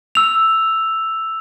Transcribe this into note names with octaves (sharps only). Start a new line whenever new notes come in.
E6 F7